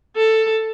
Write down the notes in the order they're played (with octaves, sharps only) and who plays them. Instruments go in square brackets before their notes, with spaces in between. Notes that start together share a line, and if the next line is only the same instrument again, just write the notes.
[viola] A4